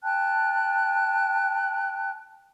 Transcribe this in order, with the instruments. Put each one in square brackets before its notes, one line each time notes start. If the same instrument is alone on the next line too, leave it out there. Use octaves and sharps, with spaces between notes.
[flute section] G5 A5 F#6